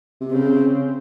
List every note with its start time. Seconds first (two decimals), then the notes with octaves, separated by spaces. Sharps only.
0.21 C3
0.32 C#3 C4